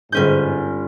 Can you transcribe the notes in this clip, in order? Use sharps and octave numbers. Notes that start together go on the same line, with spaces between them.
G1 G#2 C#4 G6